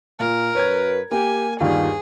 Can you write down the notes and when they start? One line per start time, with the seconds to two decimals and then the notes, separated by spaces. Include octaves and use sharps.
0.19 A#2 A#4
0.55 F#2 B4 C#5 G#6
1.11 A#3 G4 G#5
1.60 G1 D#2 D#3 G3 F4 G#4